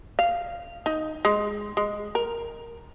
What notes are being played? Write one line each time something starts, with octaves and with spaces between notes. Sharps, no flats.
F5
D#4
G#3
G#3
A#4